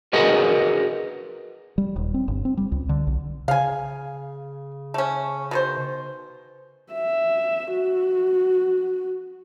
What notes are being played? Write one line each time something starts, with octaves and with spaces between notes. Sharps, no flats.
F#4 G#4 A#4 B4 D#5 F#5
G3
D#1
C4
G1
C4
G3
C#2
D3
B1
C#3 F5 G#5
A3 C#4
B2 D#3 C5
E5
F#4